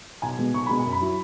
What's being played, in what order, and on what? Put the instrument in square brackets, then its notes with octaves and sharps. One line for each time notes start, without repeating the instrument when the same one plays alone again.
[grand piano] B1 [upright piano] G#5
[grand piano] B2 G#3
[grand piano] B1 [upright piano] C#6
[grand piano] B2 G#3 [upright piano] B5
[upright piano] G#5
[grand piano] F#2
[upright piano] B5
[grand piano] F#3 E4